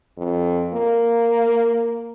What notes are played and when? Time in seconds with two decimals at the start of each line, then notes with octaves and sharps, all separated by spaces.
0.18 F2
0.74 A#3